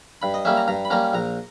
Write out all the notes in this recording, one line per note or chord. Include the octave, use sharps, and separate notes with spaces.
G2 B5
D#5
G3 A#3 C#4 E5
A#5
G2 A#5
B5
G3 A#3 C#4 A#5
A#1 A#5